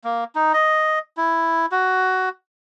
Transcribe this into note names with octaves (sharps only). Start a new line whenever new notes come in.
A#3
D#4
D#5
E4
F#4